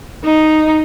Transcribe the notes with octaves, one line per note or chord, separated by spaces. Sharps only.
D#4